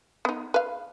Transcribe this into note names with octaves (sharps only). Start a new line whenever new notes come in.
B3 D#4
B4 F5